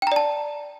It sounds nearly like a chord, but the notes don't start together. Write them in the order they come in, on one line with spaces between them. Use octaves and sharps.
G5 A#5 D5 A5